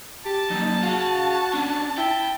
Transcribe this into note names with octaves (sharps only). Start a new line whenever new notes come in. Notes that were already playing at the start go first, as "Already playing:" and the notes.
G4 A5
F#3 A#3 D#4
F#4 G#4 F5
C#4 D4
E4 G5